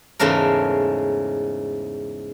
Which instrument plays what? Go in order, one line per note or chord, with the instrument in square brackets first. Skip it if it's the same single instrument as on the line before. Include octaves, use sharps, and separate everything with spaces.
[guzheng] E2 G#2 C#3 A3 A#4